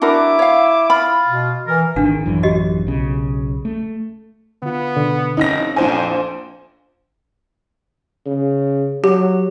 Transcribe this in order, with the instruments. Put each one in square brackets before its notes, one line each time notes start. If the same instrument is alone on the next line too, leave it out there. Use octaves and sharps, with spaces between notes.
[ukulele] D4 F#4 A#4 [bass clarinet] E4 [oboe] D6
[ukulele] C#5 F5
[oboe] F4 [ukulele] B5
[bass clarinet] B2
[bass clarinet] E3 [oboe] A#4
[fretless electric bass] G#1 D3 D#3 [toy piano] D4 F#5
[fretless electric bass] A1 F#2 E3
[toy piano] F#4 G4 D#5
[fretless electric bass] B1 C#3
A3
[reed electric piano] D3 F4 [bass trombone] B3
[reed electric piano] B2 D3
[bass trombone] F1 [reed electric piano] C4 C#4 [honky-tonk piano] D#4 A#6
[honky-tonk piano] A#1 C5 G#5 [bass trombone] F2
[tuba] C#3
[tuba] F#3 [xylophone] G4